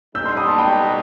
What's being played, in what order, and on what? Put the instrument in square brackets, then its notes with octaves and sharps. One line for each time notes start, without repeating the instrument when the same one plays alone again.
[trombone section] B1 B2 G3 D#4 [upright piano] E6 G6
[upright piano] C6 E6
B5 D#6
A5 C6
G5 B5